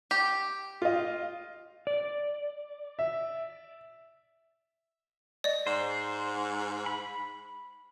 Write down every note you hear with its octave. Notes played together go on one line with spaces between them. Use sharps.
G4
F4 D#5
D5
E5
D5 D#5
G#2 C5
B5